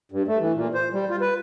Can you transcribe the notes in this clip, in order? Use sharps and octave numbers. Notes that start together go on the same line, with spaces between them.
G2
A3
E3
A#2
C5
G3
F4
B4